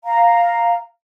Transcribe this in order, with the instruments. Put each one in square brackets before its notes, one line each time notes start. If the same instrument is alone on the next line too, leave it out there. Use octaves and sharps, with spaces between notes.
[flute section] F5 A#5